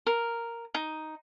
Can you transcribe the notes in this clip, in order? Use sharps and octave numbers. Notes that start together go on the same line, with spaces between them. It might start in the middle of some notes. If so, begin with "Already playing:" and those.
A#4
D#4